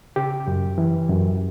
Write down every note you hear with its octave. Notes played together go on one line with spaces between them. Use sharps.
C#3 G4
F#2
E3
F#2